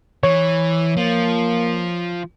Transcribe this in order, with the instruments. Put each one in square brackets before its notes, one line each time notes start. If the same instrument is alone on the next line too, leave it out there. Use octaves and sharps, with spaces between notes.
[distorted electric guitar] E3 [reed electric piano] C#5
[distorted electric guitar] F3 [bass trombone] A#3